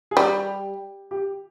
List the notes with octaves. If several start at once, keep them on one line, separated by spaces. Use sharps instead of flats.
G#4
G3 G4
G4